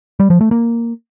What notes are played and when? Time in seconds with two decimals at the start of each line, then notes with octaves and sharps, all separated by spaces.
0.20 G3
0.30 F3
0.41 A3
0.51 A#3